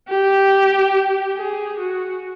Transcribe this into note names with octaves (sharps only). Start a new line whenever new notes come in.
G4
G#4
F#4